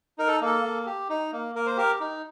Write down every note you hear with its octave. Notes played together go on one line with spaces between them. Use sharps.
D#4 A#4
A4
A#3 A4
A#3
G4
D#4
A#3
A#3 A#4
C5
G4 A#4
D#4